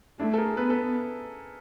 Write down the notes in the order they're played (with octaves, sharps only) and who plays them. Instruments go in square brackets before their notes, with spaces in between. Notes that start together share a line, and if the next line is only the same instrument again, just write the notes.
[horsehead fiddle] A3 [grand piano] D4 E4
[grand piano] A4
G#4 A#4
[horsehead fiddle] B3 [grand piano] A4 B4
[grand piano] A4 B4